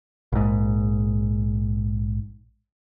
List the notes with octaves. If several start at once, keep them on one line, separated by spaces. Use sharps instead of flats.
A#1 G#2